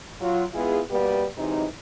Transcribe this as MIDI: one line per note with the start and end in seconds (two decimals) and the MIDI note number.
0.21 0.44 54
0.21 0.44 65
0.53 0.81 56
0.53 0.81 59
0.53 0.81 64
0.53 0.81 65
0.53 0.81 68
0.90 1.26 47
0.90 1.26 55
0.90 1.26 58
0.90 1.26 59
0.90 1.26 67
0.90 1.26 71
1.37 1.65 48
1.37 1.65 52
1.37 1.65 54
1.37 1.65 56
1.37 1.65 63